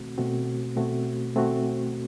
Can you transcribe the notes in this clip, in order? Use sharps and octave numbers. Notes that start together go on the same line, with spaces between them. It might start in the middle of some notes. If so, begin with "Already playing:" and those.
Already playing: B2 A3 C4 F#4
B2 A3 C4 F#4
B2 A3 C4 F#4
B2 A3 C4 F#4